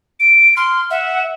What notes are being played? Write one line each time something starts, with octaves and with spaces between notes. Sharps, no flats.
D7
C6 F6
E5 F#5